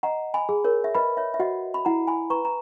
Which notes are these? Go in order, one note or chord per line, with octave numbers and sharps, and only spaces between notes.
D#5 F#5 A#5
G#5 B5
G#4
A#4 C#5
E5
B4 D#5 B5
C#5 E5
E5
F#4 D#5 F#5
B5
E4 F#5 A#5
G#5 B5
B4 A#5 C#6
A#5